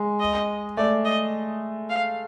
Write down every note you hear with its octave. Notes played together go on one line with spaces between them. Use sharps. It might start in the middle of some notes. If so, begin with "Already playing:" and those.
Already playing: G#3
D#5
A3 D5
D#5
F5